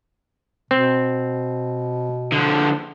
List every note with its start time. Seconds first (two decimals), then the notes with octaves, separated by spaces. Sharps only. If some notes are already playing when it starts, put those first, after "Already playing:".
0.71 B2 C4
2.32 D3 F3